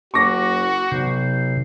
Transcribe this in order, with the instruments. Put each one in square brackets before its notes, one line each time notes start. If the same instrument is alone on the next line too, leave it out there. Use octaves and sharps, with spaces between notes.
[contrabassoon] F#1 [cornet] F#4 [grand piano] C#6 D6 A#6
[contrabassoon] B1 [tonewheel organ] C3